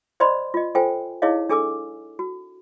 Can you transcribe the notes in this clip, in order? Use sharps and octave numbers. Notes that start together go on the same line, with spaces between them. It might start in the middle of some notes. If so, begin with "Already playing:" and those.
C5 D5 D#5 B5 C6
F4 D#5
F4 A4 C5 G5 G#5
D#4 E4 G#4 C#5 D#5 F5
D4 G#4 A4 G#5 D6 E6
F#4